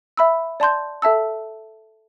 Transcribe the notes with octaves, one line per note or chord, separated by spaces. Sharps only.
E5 B5 E6
D5 A5 C6 G6
A4 E5 A5 E6